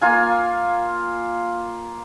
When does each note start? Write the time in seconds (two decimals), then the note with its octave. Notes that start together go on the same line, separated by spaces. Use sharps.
0.01 A#3 F4 G#5